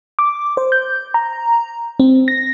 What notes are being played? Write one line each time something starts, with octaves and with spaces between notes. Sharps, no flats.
D6
C5
G6
A#5
C4
A#6